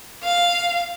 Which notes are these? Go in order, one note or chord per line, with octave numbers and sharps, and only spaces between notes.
F5